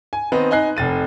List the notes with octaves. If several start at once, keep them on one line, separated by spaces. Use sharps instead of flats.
G#5
D#3 B3 C4 D#4
D#4 D#5 G#5 F#6 C7
F1 A6 D#7